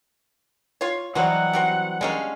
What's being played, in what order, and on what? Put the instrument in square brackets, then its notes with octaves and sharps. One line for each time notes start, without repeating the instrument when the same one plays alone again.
[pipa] F4 C#5
[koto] E3 F#3 G3 [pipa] F#4 C5 D#5 [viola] F#5
[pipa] C4 F#4 G4
[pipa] D3 G3 A#3 [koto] G#3 C#4 F5